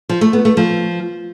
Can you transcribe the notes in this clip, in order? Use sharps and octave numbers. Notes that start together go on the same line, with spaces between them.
F3
A3
B3
A3
F3